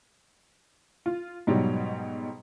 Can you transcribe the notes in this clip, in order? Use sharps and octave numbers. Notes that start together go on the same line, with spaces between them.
F4
G#2 B2 F#3 G3